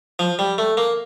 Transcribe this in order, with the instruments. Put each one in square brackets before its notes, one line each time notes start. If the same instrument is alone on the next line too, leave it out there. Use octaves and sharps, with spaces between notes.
[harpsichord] F3
G3
A3
A#3